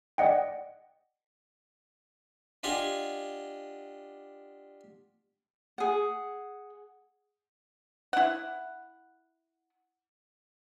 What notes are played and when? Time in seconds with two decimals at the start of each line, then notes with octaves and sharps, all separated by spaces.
0.18 D5 D#5 F#5 G5
2.63 D4 F4 G4 D#5 F#5 G#5
5.78 G#4 F#5
8.13 E4 F#5